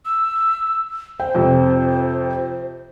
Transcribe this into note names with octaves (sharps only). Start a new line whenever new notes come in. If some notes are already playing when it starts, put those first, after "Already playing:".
E6
C5 G5
F2 C3